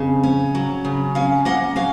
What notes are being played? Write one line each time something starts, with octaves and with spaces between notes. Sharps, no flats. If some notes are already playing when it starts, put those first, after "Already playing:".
Already playing: F2 C#3
C#4
F#3
C#3
C#4 F5 G#5
A#3 D#5 F#5
F#3 F5 G#5